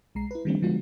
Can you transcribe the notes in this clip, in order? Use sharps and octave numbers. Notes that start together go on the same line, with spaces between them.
B1 G#3 A#5 C7
E4 B4
D#3 F3 G3 A3 C4 D4
D3 F3 G#3 B3 F4 F#4